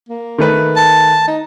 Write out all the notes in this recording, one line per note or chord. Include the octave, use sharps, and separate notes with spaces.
A#3
D#3 A3 B4
A5
D#4